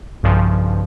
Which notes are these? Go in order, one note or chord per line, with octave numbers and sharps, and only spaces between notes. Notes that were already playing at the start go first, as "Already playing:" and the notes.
B1 G2 C#3 F3